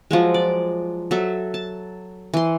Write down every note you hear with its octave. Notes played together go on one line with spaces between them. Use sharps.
F3 F#3 G#3
D5
F#3 A4 E5
A5
E3 C6